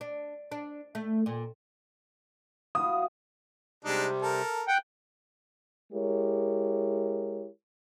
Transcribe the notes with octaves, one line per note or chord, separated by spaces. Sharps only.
D4
D4
A3
A#2
E4 F#4 F5 D#6
C3 G3 G#3 D4 D#4
A4 A#4
F#5 G5
G#3 E4 G4 A#4 C#5